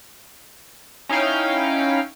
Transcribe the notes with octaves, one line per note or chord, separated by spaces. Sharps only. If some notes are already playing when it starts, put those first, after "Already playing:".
C#4 D#4 E4 F5 G5